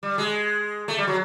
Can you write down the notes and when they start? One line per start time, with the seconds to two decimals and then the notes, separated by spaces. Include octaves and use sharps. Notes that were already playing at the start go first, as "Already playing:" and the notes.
0.03 G3
0.18 G#3
0.88 A3
0.98 G3
1.07 F#3